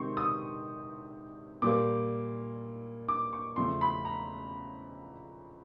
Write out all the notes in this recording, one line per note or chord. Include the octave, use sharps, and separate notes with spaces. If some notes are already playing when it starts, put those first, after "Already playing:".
Already playing: C3 D#3 G#3 C4 C6 C#6
D#6
A#2 G3 A#3 D6
D6
C#6
E2 C#3 F3 A3 C6
B5
A#5